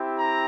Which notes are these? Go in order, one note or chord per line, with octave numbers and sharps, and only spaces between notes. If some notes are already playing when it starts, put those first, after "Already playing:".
Already playing: C4 E4 G4
A#5